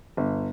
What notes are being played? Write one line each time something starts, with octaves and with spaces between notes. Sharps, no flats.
G1